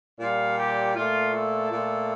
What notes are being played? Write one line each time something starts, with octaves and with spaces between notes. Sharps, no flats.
A#2 G3 F5
G4
A#2 A3 F4
A4
A#2 A3